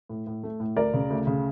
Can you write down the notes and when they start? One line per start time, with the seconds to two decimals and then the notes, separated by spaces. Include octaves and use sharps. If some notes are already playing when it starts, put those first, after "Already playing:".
0.09 A2
0.27 A2
0.43 A3
0.60 A2
0.77 D2 A#4 D5
0.94 C#3
1.10 D2
1.27 C#3